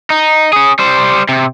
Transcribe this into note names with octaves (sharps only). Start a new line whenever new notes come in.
D#4
C#4 G#4
G3 C5
C3